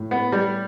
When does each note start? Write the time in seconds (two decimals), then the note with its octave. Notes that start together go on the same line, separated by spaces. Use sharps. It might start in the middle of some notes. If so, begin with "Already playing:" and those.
Already playing: A2
0.11 B3
0.32 G3